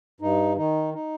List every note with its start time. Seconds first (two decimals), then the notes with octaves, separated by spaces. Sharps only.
0.20 G2 D#4
0.57 D#3 D#4
0.94 D#4